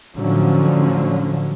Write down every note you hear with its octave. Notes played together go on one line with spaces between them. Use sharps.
A2 D3 F3 F#3 C#4